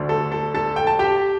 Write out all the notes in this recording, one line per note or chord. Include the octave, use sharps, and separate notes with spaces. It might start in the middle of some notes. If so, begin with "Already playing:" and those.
Already playing: D2 D3 A3 D4
A4
A4
A4 A5
G5
A5
G4 G5